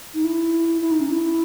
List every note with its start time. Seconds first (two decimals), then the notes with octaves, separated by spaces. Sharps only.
0.14 D#4
0.24 E4
0.82 E4
0.91 D#4
1.01 C#4
1.10 E4